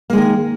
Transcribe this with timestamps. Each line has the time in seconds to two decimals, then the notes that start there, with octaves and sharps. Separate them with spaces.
0.10 A#3
0.13 G#3
0.16 D#3